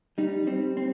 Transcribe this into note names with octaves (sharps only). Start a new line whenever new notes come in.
G3 D#4
G3 C4
C4